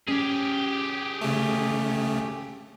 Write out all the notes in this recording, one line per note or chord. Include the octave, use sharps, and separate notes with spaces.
C#4 G4 G#4
C#3 A3